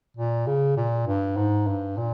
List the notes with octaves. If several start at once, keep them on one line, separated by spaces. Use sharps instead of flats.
A#2
C#3
A#2
G2
G#2
G2
A#2